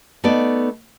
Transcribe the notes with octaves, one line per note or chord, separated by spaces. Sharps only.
A3 B3 D#4 A4 D5